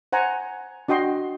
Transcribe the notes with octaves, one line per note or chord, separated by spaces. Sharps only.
C5 F#5 G#5 A#5
D4 F#4 D#5 G5 C6